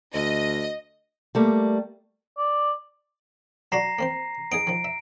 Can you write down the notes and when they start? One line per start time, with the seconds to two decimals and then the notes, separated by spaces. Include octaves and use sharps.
0.14 D2 D#5
1.35 G3 A3 A#3
2.38 D5
3.72 F#3 D4 F#4 A#5 A#6 C7
3.99 A#3 C4 C5
4.52 B3 D#4 G#4 D7
4.67 D#3 F3
4.84 E5